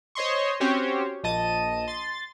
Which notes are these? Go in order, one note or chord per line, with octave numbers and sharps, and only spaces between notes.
C5 C#5 D#5 C6 C#6
C4 C#4 F#4 G4 C5 C#5
A#1 D#5 A5 D#7
C6 A6